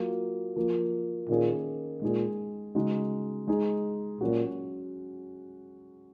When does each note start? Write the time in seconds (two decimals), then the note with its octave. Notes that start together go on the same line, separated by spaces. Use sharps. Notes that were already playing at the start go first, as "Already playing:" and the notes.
Already playing: F#3 A#3 F4
0.56 F3 A#3 F4
1.29 A#2 D#3 A#3 C#4 G#4
2.02 A#2 G#3 D#4 G#4
2.75 C#3 G#3 D#4 F#4
3.47 G#3 D#4 G#4
4.21 A#2 F#3 C#4 F#4